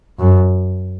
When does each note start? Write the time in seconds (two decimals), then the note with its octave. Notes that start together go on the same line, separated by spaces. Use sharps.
0.19 F#2